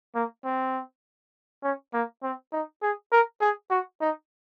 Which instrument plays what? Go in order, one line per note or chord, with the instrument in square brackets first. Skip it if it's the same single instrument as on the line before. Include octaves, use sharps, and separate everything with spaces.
[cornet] A#3
C4
C#4
A#3
C4
D#4
G#4
A#4
G#4
F#4
D#4